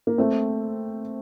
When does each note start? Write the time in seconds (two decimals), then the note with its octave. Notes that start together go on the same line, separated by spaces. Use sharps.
0.07 A#3
0.18 A3 C4